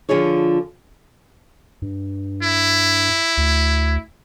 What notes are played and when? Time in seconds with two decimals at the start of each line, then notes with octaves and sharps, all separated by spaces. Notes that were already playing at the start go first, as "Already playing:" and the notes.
0.09 D3 F3 F4 G#4 C#5
1.82 G2
2.43 E4
3.37 D2